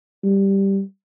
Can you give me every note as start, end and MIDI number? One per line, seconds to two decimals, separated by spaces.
0.24 0.81 55